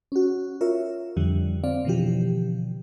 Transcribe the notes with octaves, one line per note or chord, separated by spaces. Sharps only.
C#4 F#4
F4 A#4 C#5 E5
F2 D3 G3
C4 D5 F5
B2 D3 E3 F3 G4